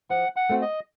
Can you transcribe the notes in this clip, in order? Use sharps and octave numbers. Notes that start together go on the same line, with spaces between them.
F3 F#5
F#5
A3 C4 F#4
D#5